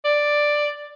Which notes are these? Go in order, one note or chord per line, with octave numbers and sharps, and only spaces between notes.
D5